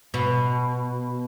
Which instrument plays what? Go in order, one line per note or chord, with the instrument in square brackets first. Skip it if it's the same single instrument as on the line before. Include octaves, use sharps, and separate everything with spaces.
[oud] B2